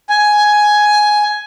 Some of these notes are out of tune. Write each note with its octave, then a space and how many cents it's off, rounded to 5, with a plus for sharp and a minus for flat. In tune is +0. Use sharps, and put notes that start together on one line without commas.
G#5 +10